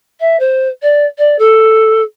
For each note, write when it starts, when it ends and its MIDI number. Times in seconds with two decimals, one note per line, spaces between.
0.19 0.38 76
0.39 0.68 72
0.81 1.05 74
1.17 1.37 74
1.38 2.02 69